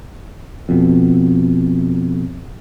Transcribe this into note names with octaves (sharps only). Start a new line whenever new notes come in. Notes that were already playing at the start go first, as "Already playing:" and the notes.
F2 B2